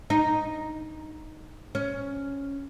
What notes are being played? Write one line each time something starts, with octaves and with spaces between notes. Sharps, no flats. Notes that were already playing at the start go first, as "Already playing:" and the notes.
D#4
C#4